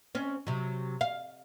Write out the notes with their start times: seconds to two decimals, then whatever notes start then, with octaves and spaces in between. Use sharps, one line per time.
0.15 C4 C#4
0.47 C3 F#3
1.01 F5